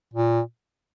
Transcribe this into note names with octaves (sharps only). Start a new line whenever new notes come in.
A#2